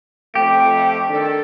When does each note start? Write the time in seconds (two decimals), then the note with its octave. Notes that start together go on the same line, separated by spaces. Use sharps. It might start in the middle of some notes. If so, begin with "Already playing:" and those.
0.35 F2 A3 C4 G4
1.08 D#3 D4 A4